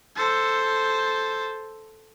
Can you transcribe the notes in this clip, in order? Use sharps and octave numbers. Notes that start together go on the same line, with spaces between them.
A4 C5